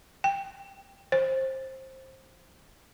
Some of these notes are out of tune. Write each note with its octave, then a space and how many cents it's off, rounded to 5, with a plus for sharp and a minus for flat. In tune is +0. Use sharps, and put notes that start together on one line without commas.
G5 +15
C5 +20